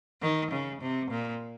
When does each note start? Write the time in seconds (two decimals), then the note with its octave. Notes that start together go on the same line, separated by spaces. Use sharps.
0.22 D#3
0.51 C#3
0.81 C3
1.11 A#2